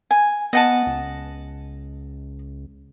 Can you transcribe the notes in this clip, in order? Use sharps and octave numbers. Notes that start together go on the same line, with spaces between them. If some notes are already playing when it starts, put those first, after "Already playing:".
G#5
B3 D#5 F#5 A5
C#2